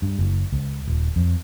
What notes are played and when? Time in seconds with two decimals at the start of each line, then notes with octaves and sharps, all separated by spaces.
0.02 G2
0.19 F#1
0.52 C#2
0.87 D#1
1.16 F2